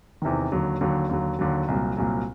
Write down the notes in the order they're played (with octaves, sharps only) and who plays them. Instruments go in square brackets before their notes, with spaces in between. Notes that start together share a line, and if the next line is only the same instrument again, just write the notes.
[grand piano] E2 C3 D#3
D#2 D3 F#3
D#2 D3 F#3
D#2 D3 F#3
D#2 D3 F#3
C2 A#2 F#3
C2 A#2 F#3